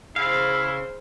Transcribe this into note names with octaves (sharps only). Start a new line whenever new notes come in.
C#3 E4 G#4 C5 F5